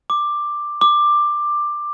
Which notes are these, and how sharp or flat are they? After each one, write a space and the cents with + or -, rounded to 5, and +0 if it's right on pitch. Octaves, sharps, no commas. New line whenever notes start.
D6 +10
D6 +15